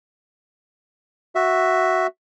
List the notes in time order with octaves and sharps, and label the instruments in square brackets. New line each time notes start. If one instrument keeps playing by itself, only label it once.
[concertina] F#4 E5